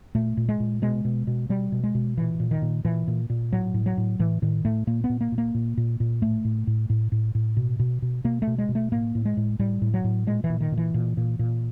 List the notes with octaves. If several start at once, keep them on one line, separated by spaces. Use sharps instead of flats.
A#2 A3
A#2
G#3
A#2
B2 G#3
B2
B2
B2 G3
B2
G#3
B2
A#2 E3
A#2
D#3
A#2
A#2 E3
A#2
A#2
A2 F#3
A2
F#3
A2
A2 E3
A2 D#3
A2 A3
A#2 A#3
B3
A#2
A#3
A#2
A#3
A#2
A#2
A#2
A2 A3
A2
A2
A2
A2
A2
B2
B2
B2
B2 A#3
A3
B2
G#3
B2
A3
A2 A#3
A2
G#3
A2
A2 G3
A2
F#3
A2
A#2 G#3
E3
A#2
D#3
A#2
E3
A#2
A#2
A#2